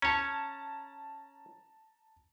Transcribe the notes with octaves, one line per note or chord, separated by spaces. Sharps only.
C#4 C#5 A5 A#5